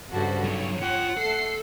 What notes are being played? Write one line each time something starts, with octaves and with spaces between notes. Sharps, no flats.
G2 C#3 F#4 A4 C5
F#3 D#4 C#5
F4 F#5 G5
A3 A4 C7